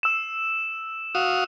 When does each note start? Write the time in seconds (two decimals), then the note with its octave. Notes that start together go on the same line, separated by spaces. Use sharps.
0.03 E6 E7
1.15 F#4 F5 D#6